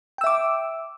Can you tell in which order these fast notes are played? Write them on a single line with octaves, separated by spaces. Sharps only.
G5 E6 E5 D6